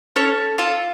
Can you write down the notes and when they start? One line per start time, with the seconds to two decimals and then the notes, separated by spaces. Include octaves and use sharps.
0.16 C#4 A4 C#5
0.58 F4 A4